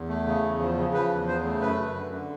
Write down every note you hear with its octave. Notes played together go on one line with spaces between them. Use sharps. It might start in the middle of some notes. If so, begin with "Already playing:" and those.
Already playing: E2
A3
C#3
E2
F3
C#3
F3 B4
E2
C#3 C5
A3
F#2 B4
F#2
D3
D3